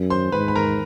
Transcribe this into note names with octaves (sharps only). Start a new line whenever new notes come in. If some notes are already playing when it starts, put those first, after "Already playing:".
Already playing: F#2
C5 C6
G#2 B4 B5
B5
A#4 A#5